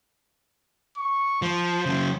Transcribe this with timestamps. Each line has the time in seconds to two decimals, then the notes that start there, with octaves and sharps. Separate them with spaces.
0.97 C#6
1.42 F3 C5
1.86 C#3 F#3